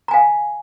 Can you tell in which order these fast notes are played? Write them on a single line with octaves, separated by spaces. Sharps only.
A#5 G#5 F5